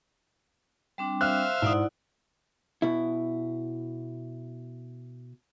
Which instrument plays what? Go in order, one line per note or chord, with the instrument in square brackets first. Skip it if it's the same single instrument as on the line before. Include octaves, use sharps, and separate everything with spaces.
[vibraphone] G3 C4 D4
[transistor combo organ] C5 E5 F5 [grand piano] F6 F#6
[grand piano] G#2 D#6 [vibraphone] E4 D5 F#5
[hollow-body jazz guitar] B2 E4